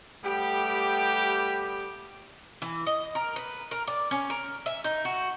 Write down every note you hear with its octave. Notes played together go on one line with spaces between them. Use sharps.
G3 A3 B3 G4
E3
D#5
A#4
B4
A#4
D5
C#4
A#4
E5
D#4
F#4